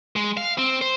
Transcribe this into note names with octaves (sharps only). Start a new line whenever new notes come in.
G#3
F5
C4
C5